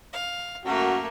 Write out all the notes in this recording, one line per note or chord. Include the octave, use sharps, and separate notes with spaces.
F5
F#2 A3 A#3 F#4